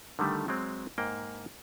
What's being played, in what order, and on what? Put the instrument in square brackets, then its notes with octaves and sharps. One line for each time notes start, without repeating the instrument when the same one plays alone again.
[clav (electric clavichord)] D3 D#3 G3 A3
F#3 G#3 C4
G#2 A#3 G5